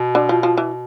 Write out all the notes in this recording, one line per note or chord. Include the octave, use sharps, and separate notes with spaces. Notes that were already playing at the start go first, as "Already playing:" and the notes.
Already playing: B2
D3
F3
F3
E3